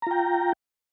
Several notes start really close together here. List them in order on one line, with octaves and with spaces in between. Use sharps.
A#5 F4 G5